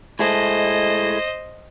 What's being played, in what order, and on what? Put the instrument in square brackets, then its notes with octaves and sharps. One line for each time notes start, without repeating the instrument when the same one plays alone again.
[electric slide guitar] A2 G#3 A3 [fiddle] C5 D#5